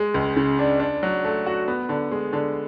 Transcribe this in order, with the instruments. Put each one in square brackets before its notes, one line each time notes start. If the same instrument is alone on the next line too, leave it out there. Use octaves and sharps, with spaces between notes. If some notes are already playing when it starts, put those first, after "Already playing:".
Already playing: [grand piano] G#3
C#2
C#3
D4
D4
F#3
A3
F#4
B3
D3
G#3
D3